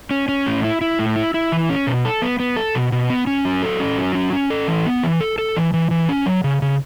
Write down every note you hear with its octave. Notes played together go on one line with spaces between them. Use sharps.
C#4
C#4
A2
E4
E4
A2
E4
E4
E3
C#4
B2
A4
B3
B3
A4
B2
B2
B3
C#4
F#3
A4
C#4
F#3
C#4
C#4
A4
E3
B3
E3
A4
A4
E3
E3
E3
C#4
F#3
C#3
C#3